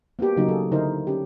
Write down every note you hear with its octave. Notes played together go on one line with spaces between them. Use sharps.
A#3 B3 F#4 G4
C#3 F#3 A#3 D#4 F#4
F#3 G#4 A4
D3 D#4 E4 A#4 C5
C#4 G4